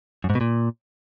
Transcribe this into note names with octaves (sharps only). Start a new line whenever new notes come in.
F#2
G#2
B2
A#2